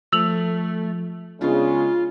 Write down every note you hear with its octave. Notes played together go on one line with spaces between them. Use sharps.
F3 A3 E6 F7 F#7
C#3 G#3 B3 D4 F4